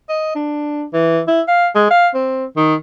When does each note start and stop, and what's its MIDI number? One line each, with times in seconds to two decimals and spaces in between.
0.09 0.34 75
0.35 0.84 62
0.93 1.20 52
1.28 1.41 64
1.48 1.67 77
1.75 1.87 56
1.90 2.08 77
2.14 2.45 60
2.56 2.75 51